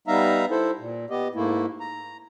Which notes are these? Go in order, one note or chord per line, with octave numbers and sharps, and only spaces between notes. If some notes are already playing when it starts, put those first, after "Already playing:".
G3 B3 D#4 E5 F5 A#5
E4 A4 C5
A#2
B3 G4 D#5
G#2 A3 A#3 E4
A#5